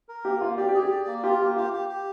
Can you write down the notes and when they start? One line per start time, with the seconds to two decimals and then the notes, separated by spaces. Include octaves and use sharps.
0.09 A#4
0.25 A#3 G4
0.41 A#3 F4
0.57 G4 D5
0.69 G4
0.74 G#4
0.79 G4
0.91 D5
1.07 A#3
1.23 F4 G4
1.40 A#3 G4
1.56 F4 G4
1.73 G4
1.89 G4